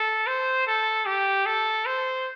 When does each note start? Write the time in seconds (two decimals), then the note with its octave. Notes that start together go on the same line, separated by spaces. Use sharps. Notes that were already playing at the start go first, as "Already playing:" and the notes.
Already playing: A4
0.27 C5
0.67 A4
1.06 G4
1.46 A4
1.86 C5